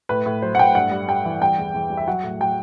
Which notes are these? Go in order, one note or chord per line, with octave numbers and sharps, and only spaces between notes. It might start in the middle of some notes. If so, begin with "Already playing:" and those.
A2 B4
A2
F#3 C5
F#5
A2 G5
G2 F#5
G3
G3 G5
E3
G3 G5
E2
E2
G3
E5
F#3 F#5
A2
F#3 G5